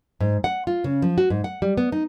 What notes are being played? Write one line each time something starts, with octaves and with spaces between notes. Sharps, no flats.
G#2
F#5
F4
C#3
F3
F#4
G#2
F#5
G3
B3
D#4